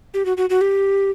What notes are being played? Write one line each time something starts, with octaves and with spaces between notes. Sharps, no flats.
G4
F#4
F#4
F#4
G4